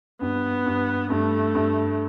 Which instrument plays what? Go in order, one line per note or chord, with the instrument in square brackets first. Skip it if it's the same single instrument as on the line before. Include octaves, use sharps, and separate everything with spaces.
[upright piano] G2 [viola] B3
[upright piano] G2
[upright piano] G2 [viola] A3
[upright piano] G2